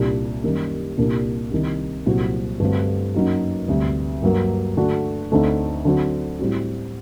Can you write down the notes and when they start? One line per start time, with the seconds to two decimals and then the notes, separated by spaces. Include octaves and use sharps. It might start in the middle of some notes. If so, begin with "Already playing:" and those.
Already playing: C2 A#2 G3 D4
0.44 F#2 D#3 G3 A#3
0.97 C2 A#2 G3 A#3 D4
1.51 C2 C3 D#3
2.06 C2 A#2 F#3 C4 F#4
2.60 G2 D3 A3 C4 F#4
3.14 F#2 F#3 A#3 D#4 F#4
3.68 D2 C3 G3
4.22 G2 F#3 A#3
4.77 D3 A3 D4 F#4
5.32 D2 D3 A3 C4 D#4
5.85 D3 F#3 C4 F#4
6.39 A2 G3 C4 F#4